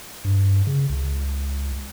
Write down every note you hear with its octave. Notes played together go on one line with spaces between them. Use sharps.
G2
C#3
C#2